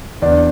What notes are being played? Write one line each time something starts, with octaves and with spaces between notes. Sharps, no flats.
E2 D4 D5